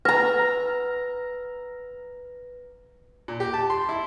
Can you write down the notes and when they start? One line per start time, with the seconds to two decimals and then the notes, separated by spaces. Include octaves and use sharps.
0.05 B4 A#5 E6 F6 A#6
3.28 A#2
3.40 G4
3.54 A5
3.70 C6
3.89 E4